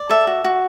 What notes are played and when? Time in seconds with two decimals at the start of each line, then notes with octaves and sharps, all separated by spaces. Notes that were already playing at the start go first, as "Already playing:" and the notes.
Already playing: D5
0.09 A4 E5
0.27 F#4
0.44 F#4